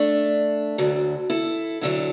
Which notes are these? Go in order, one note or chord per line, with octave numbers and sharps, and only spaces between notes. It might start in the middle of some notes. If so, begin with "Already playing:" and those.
Already playing: A3 D4
D2 D3 F#3
E4 A4
D2 D3 F#3 E4 A4